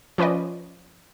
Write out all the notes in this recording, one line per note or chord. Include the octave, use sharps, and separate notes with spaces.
F3 C#4 B4 D5 D#5